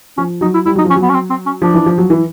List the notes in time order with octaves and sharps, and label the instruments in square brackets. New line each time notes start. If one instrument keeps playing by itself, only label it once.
[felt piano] F3 [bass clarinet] C#4
[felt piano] F#3 [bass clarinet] D#4
[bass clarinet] E4
[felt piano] G3 [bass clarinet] E4
[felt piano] F#3 [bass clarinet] D#4
[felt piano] F3
[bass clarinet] C#4
[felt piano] F#3
[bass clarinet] B3
C#4
C4
C4
C#4
[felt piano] F3 [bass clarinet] D4
[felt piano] E3
F3
F#3
E3